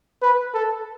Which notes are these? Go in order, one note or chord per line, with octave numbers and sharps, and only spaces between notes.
B4
A4